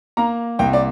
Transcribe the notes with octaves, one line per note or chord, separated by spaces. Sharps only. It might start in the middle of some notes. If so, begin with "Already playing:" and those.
A#3 A#5
C2 G5
D5